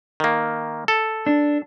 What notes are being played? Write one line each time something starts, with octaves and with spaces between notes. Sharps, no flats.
D#3 A#3
A4
D4